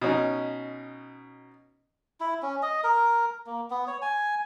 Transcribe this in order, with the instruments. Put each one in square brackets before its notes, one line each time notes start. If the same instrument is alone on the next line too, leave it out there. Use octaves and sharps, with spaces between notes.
[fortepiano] B2 C#4 D#4
[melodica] E4
C#4
D#5
A#4
A#3
B3
C#5
G#5